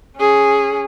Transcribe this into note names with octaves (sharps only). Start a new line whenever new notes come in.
C#4 G#4